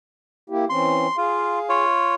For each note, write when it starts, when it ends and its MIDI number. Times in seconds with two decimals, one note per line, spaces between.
0.50 0.65 58
0.50 0.65 64
0.50 0.65 67
0.70 1.07 52
0.70 1.07 60
0.70 1.07 61
0.70 1.17 84
1.18 1.59 65
1.18 1.84 68
1.18 1.84 77
1.69 2.15 65
1.69 2.15 73